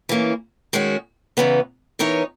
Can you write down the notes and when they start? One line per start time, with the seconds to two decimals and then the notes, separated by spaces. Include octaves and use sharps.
0.09 E3 A#3 C#4
0.73 D#3 G#3 C#4 F#4
1.37 E2 C#3 E3 B3 D#4
1.99 E3 B3 D#4 A#4 C#5